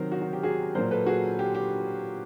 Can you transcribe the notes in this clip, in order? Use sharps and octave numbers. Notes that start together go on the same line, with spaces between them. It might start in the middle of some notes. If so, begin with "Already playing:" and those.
Already playing: C3 D#3 F#3 A#4 C5
F#4
F#4
G4
F#4 G#4
A#2 F#3 A#4 C5
A4 B4
F#4 G#4
G4
G4